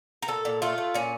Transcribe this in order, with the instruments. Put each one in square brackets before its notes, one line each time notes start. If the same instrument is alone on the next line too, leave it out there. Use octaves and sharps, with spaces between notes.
[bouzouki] A#4
A#2 A4
A#2
A3 F4
A3
A#2 C#4